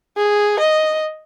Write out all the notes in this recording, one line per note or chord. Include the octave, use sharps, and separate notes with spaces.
G#4
D#5